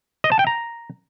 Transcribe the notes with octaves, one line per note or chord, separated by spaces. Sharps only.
D#5
A5
G5
A#5